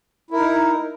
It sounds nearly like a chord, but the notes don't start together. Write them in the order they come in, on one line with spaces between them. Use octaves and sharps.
E4 A#4 D#4